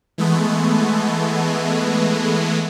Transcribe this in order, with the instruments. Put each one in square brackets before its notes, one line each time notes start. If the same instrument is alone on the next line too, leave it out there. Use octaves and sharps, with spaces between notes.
[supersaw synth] E3 G#3 A3 B3